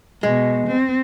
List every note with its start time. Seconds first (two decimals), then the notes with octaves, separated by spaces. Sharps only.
0.23 B2 G#3
0.68 C4